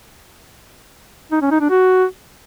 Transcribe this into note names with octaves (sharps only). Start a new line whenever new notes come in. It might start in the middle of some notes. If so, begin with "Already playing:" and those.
D#4
C#4
D#4
D4
F#4